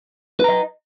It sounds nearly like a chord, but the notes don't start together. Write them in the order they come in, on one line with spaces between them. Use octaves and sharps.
B4 A#5 D#5